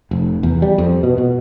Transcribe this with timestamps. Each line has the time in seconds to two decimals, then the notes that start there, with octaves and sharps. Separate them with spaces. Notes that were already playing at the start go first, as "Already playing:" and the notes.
0.11 F1
0.43 E2
0.62 G3
0.78 F2
1.03 B2
1.18 B2